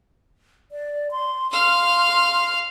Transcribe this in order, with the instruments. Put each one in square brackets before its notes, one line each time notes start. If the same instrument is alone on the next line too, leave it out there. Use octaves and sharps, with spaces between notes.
[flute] D5
C6
[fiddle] F5 F6 [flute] C6